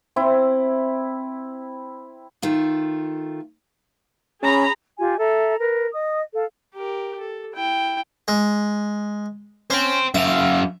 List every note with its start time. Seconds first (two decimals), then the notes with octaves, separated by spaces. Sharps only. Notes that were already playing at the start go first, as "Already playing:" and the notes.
0.16 C4 E4
2.42 D#3 A3 F4
4.42 C#4 G#4 A#5 B5
4.99 F4 G4 G#5
5.19 A4 E5 A#5
5.61 A#4 B4
5.92 D#5 D#6
6.34 A4 F5
6.75 G4 A#4
7.20 A4
7.54 E4 G5
8.28 G#3
9.70 C#4 C5 G5
10.14 F#2 E5 F5